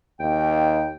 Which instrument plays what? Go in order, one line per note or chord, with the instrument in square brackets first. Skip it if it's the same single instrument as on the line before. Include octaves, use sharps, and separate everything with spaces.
[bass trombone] D#2 [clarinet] G5